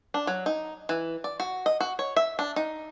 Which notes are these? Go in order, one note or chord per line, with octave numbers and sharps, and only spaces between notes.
D4
F#3
D#4
E3
D5
F#4
D#5
F#4
C#5
E5
D4
D#4